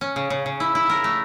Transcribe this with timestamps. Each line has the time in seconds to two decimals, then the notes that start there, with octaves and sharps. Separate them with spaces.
0.01 C#4
0.16 C#3
0.30 C#3
0.46 C#3
0.60 E4
0.75 E4
0.90 A#4
1.04 A3